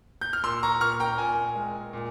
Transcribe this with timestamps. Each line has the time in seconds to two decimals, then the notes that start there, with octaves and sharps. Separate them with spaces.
0.21 G6
0.33 F6
0.44 A#2 C6 E6
0.63 A#5 C#6
0.81 A#2 C#6 F6
1.00 G5 A#5
1.18 A#2 G#5
1.55 G#3
1.93 A#2